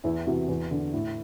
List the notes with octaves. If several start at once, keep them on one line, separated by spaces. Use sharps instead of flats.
E2 E4
C3 E3 F#4
E2
D3
A2 E4